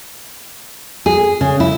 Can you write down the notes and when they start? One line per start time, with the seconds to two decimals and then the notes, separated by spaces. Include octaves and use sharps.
1.06 G#4
1.41 C#3
1.60 E4